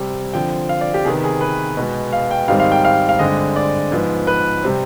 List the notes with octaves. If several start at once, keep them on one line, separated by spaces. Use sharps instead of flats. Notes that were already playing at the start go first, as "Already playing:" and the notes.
Already playing: C3 G3 C4
D3 F3 C4 G5
F5
D5
G4
C3 D#3 B3 G#4
G#4
B4
B2 G#3 B3
F5
G5
G#2 D#3 G3 C4 F5
F5
G5
F5
F5
G2 D3 G#3 C4 D#5
D5
G#2 F3 B3
B4
C3 G3 C4